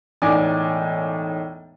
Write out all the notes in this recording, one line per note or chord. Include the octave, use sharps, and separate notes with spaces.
E1 A2 D#4 D5 G#5 D6